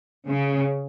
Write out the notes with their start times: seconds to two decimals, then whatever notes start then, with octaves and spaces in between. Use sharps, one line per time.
0.28 C#3